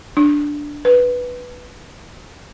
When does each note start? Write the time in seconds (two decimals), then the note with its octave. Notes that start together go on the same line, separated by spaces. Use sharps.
0.17 D4
0.85 B4